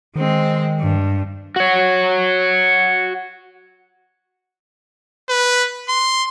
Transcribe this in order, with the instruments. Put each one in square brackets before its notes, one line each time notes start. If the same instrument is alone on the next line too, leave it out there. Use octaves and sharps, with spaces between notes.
[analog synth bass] D#3 [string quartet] G#3 C4
[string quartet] G2
[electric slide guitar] F#4 C#5
[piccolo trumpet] B4
C6